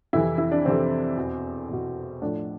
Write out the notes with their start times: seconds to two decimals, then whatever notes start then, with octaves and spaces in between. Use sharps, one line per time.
0.13 F2 C3 E3 E4
0.38 E4
0.51 D4
0.65 F2 C3 E3 C4
1.17 E2 B2
1.69 E2 B2
2.22 A2 F3 D4